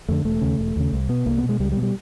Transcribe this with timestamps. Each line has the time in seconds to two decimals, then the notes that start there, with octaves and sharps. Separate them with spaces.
0.09 F2 D3 A3
0.25 E1 A3
0.41 D#2 C#3
0.59 E1
0.76 D#2 C#3
0.93 C2
1.09 B2 B3
1.26 C2 A#3
1.38 B3
1.43 B2
1.49 G#3
1.60 C#2 G3
1.72 G3
1.76 B2
1.82 G3